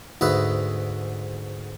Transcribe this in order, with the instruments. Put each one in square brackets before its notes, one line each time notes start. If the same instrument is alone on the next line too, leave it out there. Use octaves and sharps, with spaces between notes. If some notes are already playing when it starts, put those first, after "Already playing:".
[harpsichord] D2 G#2 B4 E5